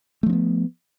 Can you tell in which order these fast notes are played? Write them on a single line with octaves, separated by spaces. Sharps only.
A3 F3 C4 B3